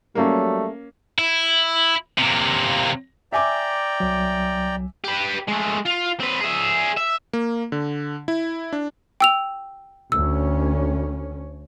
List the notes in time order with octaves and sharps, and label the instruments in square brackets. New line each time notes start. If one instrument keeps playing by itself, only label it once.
[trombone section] F#3 G3 A3 [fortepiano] A#3 C#4
[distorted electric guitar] E4
C3 A#3
[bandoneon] D5 G5 A#5 [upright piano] E5 G#5 D6
[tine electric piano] C2 F#3
[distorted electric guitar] G4 B4
G#3 A3
F4
C4 B4
G#4 E5
E5
[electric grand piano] A#3
D3
E4
D4
[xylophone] G5 E6 F7
[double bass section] D2 C#4 [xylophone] E6